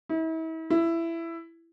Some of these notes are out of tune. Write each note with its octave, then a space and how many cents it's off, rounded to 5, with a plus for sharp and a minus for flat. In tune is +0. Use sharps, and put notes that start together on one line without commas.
E4 -40
E4 +15